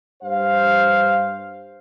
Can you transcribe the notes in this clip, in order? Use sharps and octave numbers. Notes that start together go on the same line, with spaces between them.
G2 C5 F5